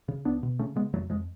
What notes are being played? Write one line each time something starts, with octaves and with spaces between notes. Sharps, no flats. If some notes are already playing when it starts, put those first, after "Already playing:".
C#3
C#2 B3 D4
B2
C#3 A3 C#4
C#3 G#3 B3
F2 F#3 A3
F2 F3 G#3